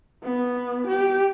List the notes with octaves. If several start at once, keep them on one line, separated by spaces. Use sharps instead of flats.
B3
G4